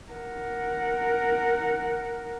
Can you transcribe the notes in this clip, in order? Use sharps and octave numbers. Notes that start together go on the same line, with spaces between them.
A#4 F#5